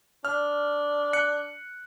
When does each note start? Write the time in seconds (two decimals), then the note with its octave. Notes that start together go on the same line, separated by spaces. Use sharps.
0.25 D4 F6
1.13 F#6 C#7